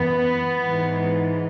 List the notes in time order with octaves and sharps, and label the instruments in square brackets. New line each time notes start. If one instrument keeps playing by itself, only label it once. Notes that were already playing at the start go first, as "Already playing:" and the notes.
Already playing: [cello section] F#2 E3 B3
G#2 E3